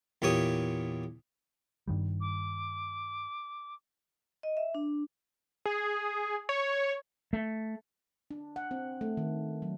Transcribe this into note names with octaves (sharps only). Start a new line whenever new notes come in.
E2 A#2 G4 C#5 D#6
G2 D#3 G3
D6
D#5
E5
D4
G#4
C#5
A3
D4
F#5
C4
A3
D#3
F#3